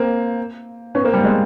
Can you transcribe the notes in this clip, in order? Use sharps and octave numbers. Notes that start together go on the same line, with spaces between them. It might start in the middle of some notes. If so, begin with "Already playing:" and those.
Already playing: A#3 C4
B3 C#4
A#3 C4
G3
G#3